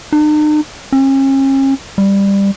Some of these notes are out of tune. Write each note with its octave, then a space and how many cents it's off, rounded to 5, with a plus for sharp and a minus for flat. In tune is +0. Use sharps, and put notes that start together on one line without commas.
D#4 -45
C#4 -40
G3 +15